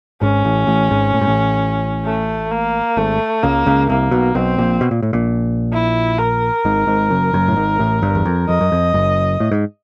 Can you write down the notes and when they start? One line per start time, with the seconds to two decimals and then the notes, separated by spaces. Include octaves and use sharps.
0.21 G#1 G#2 C#4
0.45 A1 A2
0.67 A1 A2
0.90 G#1 G#2
1.14 A2
1.21 G#2
1.28 A1 A2
2.05 A3
2.51 A#3
2.97 G#1 G#2 A3
3.43 C#2 C#3 A#3
3.66 C#2 C#3
3.89 C2 C3 A#3
4.11 B1 B2
4.35 B1 B2 C4
4.58 A#1 A#2
4.81 B2
4.91 A#2
5.02 A2
5.13 A#1 A#2
5.73 E4
6.18 A#4
6.65 G#1 G#2
6.87 G#1 G#2
7.10 F#1 F#2
7.33 F#1 F#2
7.48 A2
7.56 G#1 G#2
7.79 A1 A2
8.02 G1 G2
8.15 E2
8.25 F2
8.48 F2 D#5
8.61 F#2
8.72 F2
8.94 F#1 F#2
9.40 A2
9.51 G#2